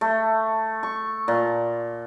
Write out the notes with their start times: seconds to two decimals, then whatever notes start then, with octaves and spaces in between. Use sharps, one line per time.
0.01 A3
0.83 C#6
1.28 A#2